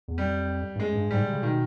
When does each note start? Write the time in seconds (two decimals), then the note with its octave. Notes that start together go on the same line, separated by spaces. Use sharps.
0.08 E2
0.18 F2 G3
0.75 G2
0.80 F#2 G#3
0.95 G2
1.11 G#2 G3
1.21 C3
1.33 C#3
1.42 B2 D#3